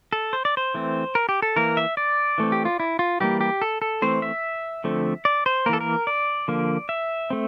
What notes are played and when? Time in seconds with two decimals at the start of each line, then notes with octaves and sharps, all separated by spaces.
0.13 A4
0.33 C5
0.45 D5
0.57 C5
0.74 E3 A3 C4
1.15 A#4
1.29 G4
1.42 A4
1.56 E3 A#3 A#4
1.77 E5
1.97 D5
2.38 E3 A3 C4
2.52 G4
2.65 F4
2.80 E4
2.99 F4
3.20 E3 G3 A#3 G4
3.41 G4
3.62 A4
3.82 A4
4.02 E3 A3 C4 C5
4.22 E5
4.84 D3 F3 A3 C4
5.25 D5
5.46 C5
5.66 A#3 A#4
5.69 E3 A4
5.81 A#4
6.07 D5
6.48 D3 F3 A#3
6.89 E5
7.30 A3 C4